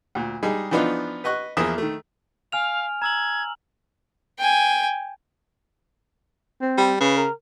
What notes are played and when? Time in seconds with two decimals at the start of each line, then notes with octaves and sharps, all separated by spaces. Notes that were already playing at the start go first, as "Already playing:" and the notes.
0.15 D2 A#2
0.43 G3 G#3 D#4 G#4
0.71 E3 F3 B3 D4 D#4 F4
1.24 B4 D#5 C#6 F#6
1.57 E2 F3 A#3 G#4 E5 D#6
1.78 D#3 A3
2.52 F5 G#5 F6 F7
3.02 A#5 E6 G#6 F#7
4.39 G5 G#5
6.61 C4
6.78 G3
7.00 C#3 B4
7.17 A#4